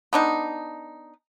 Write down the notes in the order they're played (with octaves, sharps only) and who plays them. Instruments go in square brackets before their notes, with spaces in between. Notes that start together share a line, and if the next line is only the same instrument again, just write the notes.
[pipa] B3 D4 D#4